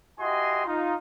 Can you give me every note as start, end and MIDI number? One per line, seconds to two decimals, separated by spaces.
0.19 0.63 64
0.19 0.63 66
0.19 0.63 67
0.19 0.63 75
0.19 0.63 80
0.19 0.63 84
0.65 0.94 63
0.65 0.94 65